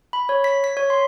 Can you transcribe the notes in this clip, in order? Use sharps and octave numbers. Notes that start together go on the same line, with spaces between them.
B5
C#5
B6
B6
C#5
C6